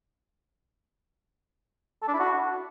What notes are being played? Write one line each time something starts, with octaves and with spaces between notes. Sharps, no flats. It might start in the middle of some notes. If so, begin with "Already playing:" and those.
A4
D4
E4
F#4